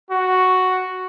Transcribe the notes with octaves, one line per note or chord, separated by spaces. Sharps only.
F#4